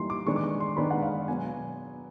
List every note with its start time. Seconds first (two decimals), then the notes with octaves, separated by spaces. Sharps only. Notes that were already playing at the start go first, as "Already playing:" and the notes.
Already playing: E3 G3 A#3 D#4 C6
0.10 D6
0.26 D#3 G#3 B3 D4 C#6
0.36 D6
0.44 C#6
0.60 C6
0.77 D#3 G#3 B3 D4 B5
0.91 F#5
1.02 F5
1.28 B2 F#3 B3 G#5